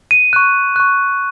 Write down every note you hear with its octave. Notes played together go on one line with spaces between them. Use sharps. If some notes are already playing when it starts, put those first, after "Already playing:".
D#7
C#6 F#6
C#6 F#6